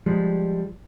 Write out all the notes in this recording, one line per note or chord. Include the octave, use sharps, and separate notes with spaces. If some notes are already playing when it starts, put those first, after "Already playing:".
F3 G3 G#3